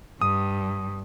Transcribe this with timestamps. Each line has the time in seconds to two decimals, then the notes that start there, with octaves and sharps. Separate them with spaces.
0.21 G2 D#6